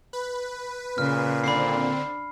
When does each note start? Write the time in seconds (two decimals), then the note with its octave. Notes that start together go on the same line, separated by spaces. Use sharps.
0.13 B4
0.98 A#2 C#3 G#4 F6
1.44 D3 C4 D4 B5 C7